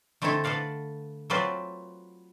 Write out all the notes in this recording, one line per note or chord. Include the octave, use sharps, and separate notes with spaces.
D3 A3 C4 D#4 E4 A4
A4 B4 D5 F5 F#5
F#3 C4 F4 F#4 B4 D5